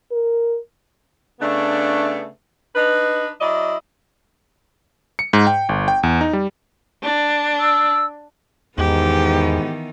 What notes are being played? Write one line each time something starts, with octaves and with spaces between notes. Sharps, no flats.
A#4
C#3 A3 B3 D4
D4 D#4 B4
F#3 E4 D5 D#5
C#7
G#2
G5
G1
G5
E2
D#4
G3
D4
E6
E2 G#2 D#3 E3 B3 G4